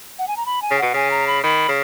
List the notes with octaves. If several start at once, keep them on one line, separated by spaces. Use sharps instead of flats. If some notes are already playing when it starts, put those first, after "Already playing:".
F#5
G#5
A#5
B5
G#5
C#3
B2 F#5
C#3 G#5
A#5
B5
D#3 B5
C#3